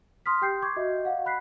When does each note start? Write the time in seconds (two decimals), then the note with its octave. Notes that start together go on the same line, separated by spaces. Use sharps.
0.26 C6 D#6 F6 B6
0.42 G4 G5 G6 C7
0.62 C#6 D6 G6 G#6
0.76 F#4 D#5 E5
1.05 F5 F#5
1.26 B5 F#6 B6 C7